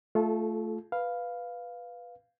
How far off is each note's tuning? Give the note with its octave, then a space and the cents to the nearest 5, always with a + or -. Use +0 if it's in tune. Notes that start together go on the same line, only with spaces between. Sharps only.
A3 +0 F4 +0 A4 -30
B4 +0 F5 +0